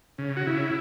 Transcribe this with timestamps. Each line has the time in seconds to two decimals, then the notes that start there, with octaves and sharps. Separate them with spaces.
0.18 C#3
0.37 F#4
0.47 C#3 E4